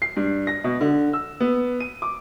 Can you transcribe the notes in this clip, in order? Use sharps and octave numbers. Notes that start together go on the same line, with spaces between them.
C7
G2
A#6
B2
D3
E6
B3
D#7
D6